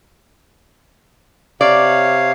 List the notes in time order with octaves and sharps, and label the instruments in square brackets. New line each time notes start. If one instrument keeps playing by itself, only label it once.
[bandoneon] C3 C#5 F5 [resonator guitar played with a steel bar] D5